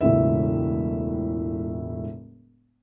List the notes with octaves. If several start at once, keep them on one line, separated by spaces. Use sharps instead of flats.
E1 C#2 A2 E4 E5